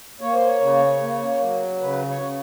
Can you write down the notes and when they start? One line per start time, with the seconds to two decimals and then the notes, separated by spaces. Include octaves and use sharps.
0.21 A#3 C#5
0.34 C5
0.47 C#5
0.61 C#3
1.01 A#3
1.42 F#3
1.82 C#3 B4
2.09 C#5
2.22 C#3